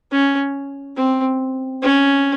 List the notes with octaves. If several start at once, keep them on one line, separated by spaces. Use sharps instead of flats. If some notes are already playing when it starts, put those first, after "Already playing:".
C#4
C4
C#4